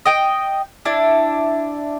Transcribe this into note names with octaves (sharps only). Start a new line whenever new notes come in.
D#5 G5
D4 E4